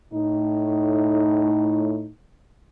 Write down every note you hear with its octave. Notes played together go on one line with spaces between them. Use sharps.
A2 D#4